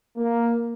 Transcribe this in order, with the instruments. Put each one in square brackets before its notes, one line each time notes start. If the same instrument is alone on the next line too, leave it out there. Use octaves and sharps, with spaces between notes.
[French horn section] A#3